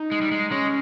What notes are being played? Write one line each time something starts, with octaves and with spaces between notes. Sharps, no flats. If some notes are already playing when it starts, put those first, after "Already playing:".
Already playing: D#4
G#3
G3
G#3
G#3 C#4